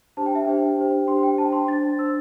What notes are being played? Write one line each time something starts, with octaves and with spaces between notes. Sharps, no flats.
D4 G4 C5 A5
G5
E5
D4 G4 C5 G5
D4 G4 C5
D4 G4 C5 C6
G5
D4 C5 A5
C6
D4 C5 A6
D4 C5 E6